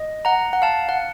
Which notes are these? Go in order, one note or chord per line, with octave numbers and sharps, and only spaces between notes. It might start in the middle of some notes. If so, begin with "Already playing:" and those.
Already playing: D#5
F#5 A#5
F#5
F5 A5
F#5